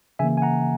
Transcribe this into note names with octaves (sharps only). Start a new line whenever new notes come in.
C#3 E3 A#3 E5 G#5
G#5
F#5 A#5